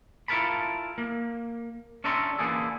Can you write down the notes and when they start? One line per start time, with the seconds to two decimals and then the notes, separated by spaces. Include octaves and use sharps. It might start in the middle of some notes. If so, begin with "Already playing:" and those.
0.28 E4 F4 A4 A#4 A5 B5
0.98 A#3
2.04 C#4 D4 A4 E5 A#5 C6
2.38 D3 E3 A#3 E4 G#4 A4